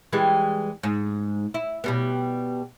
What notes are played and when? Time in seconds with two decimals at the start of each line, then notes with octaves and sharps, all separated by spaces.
0.13 E3 G3 G#3
0.83 G#2
1.54 E4
1.84 B2 G3 B3